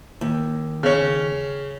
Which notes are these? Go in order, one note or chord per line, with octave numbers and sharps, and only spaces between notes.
D#2
C#3 C#4